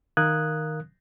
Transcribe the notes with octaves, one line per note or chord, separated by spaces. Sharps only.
D#3 A#4 F5 D#6 F#6 G#6